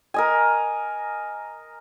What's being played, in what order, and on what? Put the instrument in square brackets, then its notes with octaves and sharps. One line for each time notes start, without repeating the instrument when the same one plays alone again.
[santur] A#4 D#5 G#5